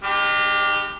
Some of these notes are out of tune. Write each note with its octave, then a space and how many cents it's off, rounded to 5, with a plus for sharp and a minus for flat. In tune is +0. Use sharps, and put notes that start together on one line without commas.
G#3 -35 D#4 -35 G4 +5